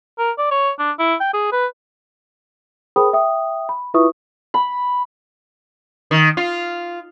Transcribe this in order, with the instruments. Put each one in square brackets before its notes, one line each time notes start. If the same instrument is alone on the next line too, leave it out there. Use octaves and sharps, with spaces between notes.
[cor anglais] A#4
D5
C#5
D4
E4
G5
G#4
B4
[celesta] G#4 A#4 C5 G5 B5 D#6
E5 G5 D#6
B5
E4 F4 B4 E5 C#6 D#6
[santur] B5
[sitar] D#3
F4